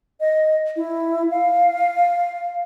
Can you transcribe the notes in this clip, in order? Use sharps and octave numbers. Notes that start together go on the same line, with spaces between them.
D#5
E4
F5